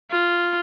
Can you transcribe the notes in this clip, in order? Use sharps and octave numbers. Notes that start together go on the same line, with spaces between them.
F4